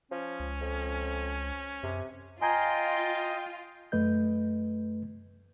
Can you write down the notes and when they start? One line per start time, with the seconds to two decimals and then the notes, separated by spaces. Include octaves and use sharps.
0.11 F3 C#4
0.40 C#2
0.61 F2
1.83 F#2 C3
2.42 F4 D#5 G5 G#5 A#5 C6 G#6
3.92 F#2 A3 B4 D#5 G6